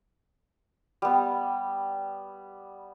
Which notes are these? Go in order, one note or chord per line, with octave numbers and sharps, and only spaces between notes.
G3 B3